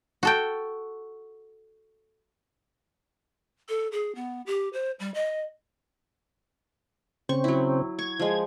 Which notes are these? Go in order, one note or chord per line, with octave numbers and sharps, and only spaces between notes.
F#4 A4 G5
A4
G#4
B3
G4
C5
G3
D#5
C#3 C4 C#6
F#3 E4
C#6 G#6
F3 G#3